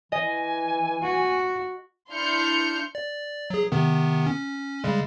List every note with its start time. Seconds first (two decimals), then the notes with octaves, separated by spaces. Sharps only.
0.12 E3 D#5 G#5
1.02 F#4
2.11 D4 E4 C6 F6 G6 C#7
2.95 D5
3.50 F#3 G#4
3.72 C3 D#3 B3
4.26 C#4
4.84 C#3 G3 G#3